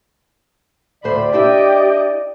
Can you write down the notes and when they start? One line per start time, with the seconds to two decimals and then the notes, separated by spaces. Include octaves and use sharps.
1.04 D2 A2 C5 D5 B5
1.33 D4 E4 G4 D#5 E5 G5